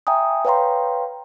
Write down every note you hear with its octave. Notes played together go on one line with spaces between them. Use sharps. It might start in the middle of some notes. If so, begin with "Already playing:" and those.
E5 G5 G#5 A#5 D#6
B4 C#5 F5 G5 A#5 C6